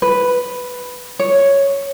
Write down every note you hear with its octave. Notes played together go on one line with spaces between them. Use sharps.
B4
C#5